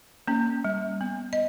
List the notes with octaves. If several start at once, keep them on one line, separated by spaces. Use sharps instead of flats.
A#3 C#4
G3
B3
D#5